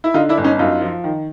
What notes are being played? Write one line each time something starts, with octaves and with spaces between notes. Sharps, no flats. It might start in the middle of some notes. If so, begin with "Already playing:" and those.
E4
D3 D#4 F4
D4 E4
G1
C#4 D#4
F#2 D#4 F4
F3
D#3